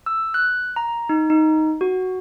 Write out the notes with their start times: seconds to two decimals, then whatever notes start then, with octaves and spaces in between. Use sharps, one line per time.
0.06 E6
0.34 F#6
0.76 A#5
1.09 D#4
1.30 D#4
1.81 F#4